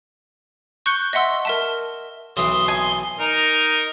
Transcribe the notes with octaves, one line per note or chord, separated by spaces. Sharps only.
C#6 F#6 G6 C#7 G7
D#5 E5 F#5 C6 E6
A#4 E5 A5
B1 E3 C6 D#6
G#5
D#4 A#4